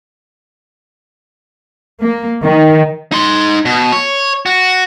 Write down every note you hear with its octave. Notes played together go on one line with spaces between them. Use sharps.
A#3
D#3
D#4 C6
B2
C#5
F#4